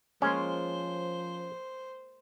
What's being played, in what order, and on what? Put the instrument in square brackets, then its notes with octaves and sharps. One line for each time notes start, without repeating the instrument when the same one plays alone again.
[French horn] F3 [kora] G#3 A#3 F4 [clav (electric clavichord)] C#4 [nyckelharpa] C5